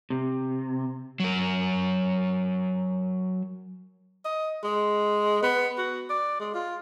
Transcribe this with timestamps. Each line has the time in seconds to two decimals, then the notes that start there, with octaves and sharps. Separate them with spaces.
0.10 C3
1.20 F#3 A#4
4.25 D#5
4.63 G#3
5.42 B3
5.78 F#4
6.09 D5
6.40 G#3
6.54 F4